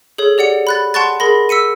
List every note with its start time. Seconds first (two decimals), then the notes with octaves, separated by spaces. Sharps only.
0.18 G#4 A4 C#5
0.38 G4 D5 F#5 C#7
0.67 B5 F#6 A6
0.94 F#5 A5 C6 C#6 F#6 A6
1.20 G#4 A#4 B5 A#6
1.49 E6 B6 C#7 D#7